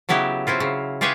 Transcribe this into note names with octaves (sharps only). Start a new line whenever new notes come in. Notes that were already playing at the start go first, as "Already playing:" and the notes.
C#3 F#3 B3 E4 G4
F#3 C4 E4 F4
C#3
F4 G4 G#4 B4 C#5 E5